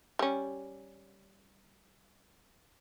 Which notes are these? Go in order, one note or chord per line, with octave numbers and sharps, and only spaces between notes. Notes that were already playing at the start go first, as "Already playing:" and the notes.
G3 C#4